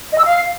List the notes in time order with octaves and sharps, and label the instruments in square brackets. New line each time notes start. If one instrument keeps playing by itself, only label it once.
[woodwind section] D#5
E6
F5